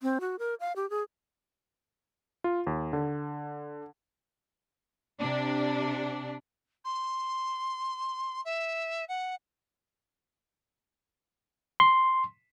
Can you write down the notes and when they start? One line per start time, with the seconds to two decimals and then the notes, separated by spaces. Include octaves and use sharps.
0.02 C4
0.21 F#4
0.39 A#4
0.60 F5
0.76 G4
0.90 G#4
2.44 F4
2.67 D#2
2.93 D3
5.19 C3 D4
6.84 C6
8.45 E5
9.08 F#5
11.80 C6